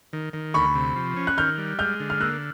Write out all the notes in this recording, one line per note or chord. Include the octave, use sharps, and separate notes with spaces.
D#3
D#3
D2 B5 C#6
C3
F3
C#4
F#6
D#3 F6 G6
G3
G#3 F6 G6
D3
F6
A#3 E6 F#6